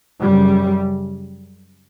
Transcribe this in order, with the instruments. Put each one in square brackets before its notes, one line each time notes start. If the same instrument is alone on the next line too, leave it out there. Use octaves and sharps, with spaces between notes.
[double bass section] F#2 C#3 G3